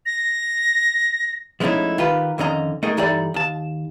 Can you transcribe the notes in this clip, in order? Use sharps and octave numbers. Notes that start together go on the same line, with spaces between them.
A#6
F3 G#3 A3 C#4 D#4 E4
D#3 F4 G4 B4
F2 D3 D#3 C#4 D#5 A#5
A3 D#4 G#4 A#4 D#5
G2 E3 D#4 G4 A4 D5
D#2 A5